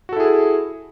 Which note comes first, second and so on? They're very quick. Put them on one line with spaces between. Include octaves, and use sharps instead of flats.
F#4 A4 E4 G#4